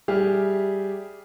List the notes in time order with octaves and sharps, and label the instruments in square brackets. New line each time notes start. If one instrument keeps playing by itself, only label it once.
[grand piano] G3 G4 G#4 E5 F6